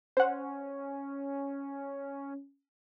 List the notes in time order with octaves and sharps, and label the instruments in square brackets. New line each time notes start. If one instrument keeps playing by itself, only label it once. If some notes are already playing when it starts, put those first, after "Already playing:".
[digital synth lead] C#4 [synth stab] C5 F#5